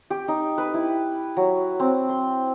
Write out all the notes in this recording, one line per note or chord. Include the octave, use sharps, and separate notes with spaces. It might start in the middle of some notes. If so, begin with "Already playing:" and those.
G4
D#4
B4
E4
F#3
C4
C6